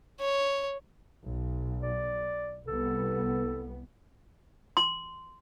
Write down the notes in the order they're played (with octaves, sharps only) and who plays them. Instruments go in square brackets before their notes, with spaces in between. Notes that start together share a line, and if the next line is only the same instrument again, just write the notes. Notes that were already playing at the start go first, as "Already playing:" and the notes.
[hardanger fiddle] C#5
[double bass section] B1
[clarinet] D5
[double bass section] C2 B3 [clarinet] A4
[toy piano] C6